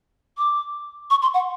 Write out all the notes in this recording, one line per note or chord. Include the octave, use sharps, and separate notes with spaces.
D6
C#6
C6
F#5